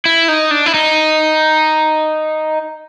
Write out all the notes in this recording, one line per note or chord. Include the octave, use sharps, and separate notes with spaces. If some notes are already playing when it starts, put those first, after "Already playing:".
E4
D#4
D4
E4
D#4